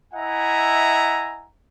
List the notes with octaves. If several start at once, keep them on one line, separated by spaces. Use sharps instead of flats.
E4 D#5 E5 F#5 G#5 A#5